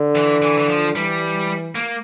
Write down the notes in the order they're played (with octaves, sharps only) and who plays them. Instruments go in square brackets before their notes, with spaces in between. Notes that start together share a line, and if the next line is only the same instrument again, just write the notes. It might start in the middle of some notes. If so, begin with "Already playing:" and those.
Already playing: [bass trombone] D3
[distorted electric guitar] E3
E3
E3
F3
[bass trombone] E3 [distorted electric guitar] G3
[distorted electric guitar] A#3